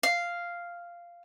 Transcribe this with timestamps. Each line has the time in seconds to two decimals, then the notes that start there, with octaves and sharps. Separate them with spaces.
0.03 F5